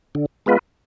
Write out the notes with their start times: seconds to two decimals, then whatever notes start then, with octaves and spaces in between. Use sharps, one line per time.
0.15 D3
0.46 G#3 B3 F4 B4